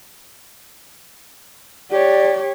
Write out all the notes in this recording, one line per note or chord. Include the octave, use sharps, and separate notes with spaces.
G4 C#5 D5